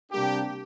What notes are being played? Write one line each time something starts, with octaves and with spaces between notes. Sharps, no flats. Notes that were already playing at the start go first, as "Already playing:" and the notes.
C3 G3 A#3 D4 G4